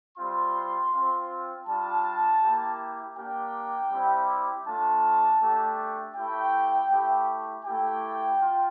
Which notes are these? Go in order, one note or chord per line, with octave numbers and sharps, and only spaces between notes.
G3 C4 F4 C6
C4 F4
G3 D4 F4 A5
A#3 E4 G4
A#3 D4 G4 G5
G3 C4 E4 G4
A3 D4 F4 A5
A3 D4 G4
A3 E4 G4 G5
A3 E4 G4
A3 E4 G4 G5
F4